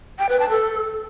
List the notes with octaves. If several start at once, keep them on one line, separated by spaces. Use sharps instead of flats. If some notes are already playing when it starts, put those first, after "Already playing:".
G5
B4
A5
A4